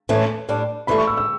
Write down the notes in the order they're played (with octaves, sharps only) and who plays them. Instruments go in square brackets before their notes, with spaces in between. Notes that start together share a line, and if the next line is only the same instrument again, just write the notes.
[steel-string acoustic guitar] A2 E3 A3 C#4
A2 G3 D4
[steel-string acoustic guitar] G2 E3 A3 [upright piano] B5
[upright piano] C#6
E6
E6